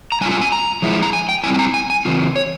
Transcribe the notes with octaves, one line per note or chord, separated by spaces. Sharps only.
A#5
G3 C#4 F4 G#5
G#5
G#5
A#5
F3 G#3 E4
A#5
G#5
G5
G3 C4 E4 G#5
G#5
A#5
G#5
G#5
C#3 E3 C4 F4
C#5